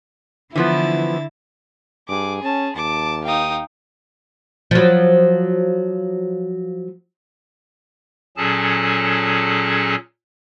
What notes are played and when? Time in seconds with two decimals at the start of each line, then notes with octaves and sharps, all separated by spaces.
0.55 D3 E3 F3 B3 E4 A6
2.09 G2 G#4 D6
2.43 C#4 A5
2.76 D#2 A5 D6
3.24 D#4 F5 G5 D#6
4.71 F3 F#3
8.37 A#2 F#3 C#4 G#4 A4 A5